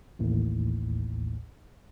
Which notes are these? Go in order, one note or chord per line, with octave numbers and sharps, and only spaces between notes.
A1 D#2 A2